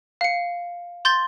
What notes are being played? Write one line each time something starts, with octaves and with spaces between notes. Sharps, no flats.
F5 C#7
C6 G6 A6 G7